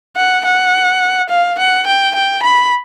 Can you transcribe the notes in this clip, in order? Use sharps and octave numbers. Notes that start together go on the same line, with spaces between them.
F#5
F#5
F5
F#5
G5
G5
B5